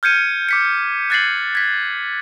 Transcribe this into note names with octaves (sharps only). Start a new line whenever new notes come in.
F6 G6 G#6 C#7 D#7
D6 B6 C#7
F#6 G#6 A6 B6 C7 F#7
G#6 B6